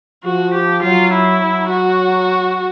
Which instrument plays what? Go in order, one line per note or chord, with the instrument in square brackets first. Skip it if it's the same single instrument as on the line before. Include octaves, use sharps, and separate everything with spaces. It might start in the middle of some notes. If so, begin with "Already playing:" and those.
[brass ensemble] F3 [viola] F#4
[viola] G4
[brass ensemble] F#3 [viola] F4
[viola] E4
[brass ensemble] F#3
[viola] F#4